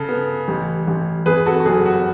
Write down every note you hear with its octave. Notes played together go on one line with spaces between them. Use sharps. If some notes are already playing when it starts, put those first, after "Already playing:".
Already playing: C#3 A4
B3
A1
A1
E2 G#4 B4
F#4 A4
F#4
F#1 G#4
F#4